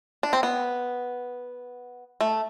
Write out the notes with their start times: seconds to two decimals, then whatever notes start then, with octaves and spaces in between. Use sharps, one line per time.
0.23 D4
0.33 C4
0.43 B3
2.21 A3